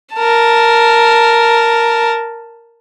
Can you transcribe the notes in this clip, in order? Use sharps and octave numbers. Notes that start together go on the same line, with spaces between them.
A#4 A5